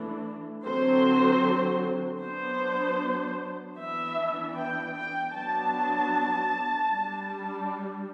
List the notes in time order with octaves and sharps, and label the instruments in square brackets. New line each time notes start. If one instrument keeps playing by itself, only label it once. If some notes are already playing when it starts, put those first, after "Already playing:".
Already playing: [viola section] E3 A3 D4
D3 F#3 C4 C5
F#3 B3 D4 C5
E3 B3 D4 E5
G5
G5
F#3 B3 D4 A5
G3 D4